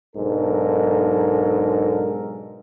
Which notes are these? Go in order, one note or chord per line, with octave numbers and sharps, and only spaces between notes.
B1 G#2 D4 A4 A#4